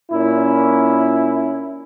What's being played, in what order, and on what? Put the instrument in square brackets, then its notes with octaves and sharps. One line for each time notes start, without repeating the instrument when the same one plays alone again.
[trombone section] A#2 C#4 E4